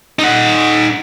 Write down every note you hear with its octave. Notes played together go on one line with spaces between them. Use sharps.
D#4 F#5